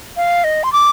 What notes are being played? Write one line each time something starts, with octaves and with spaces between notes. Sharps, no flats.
F5
D#5
C6
D6